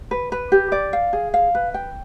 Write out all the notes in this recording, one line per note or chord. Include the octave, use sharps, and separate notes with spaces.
B4
B4
G4
D5
F5
G#4
F5
B4
G5